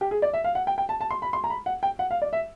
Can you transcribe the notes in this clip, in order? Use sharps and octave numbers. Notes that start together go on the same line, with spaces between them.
G4
G#4
D5
E5
F5
F#5
G5
G5
A5
A5
C6
B5
C6
A#5
B5
F#5
G5
F#5
F5
D5
E5